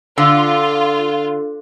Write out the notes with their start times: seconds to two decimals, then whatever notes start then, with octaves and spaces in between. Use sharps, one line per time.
0.18 D3 F4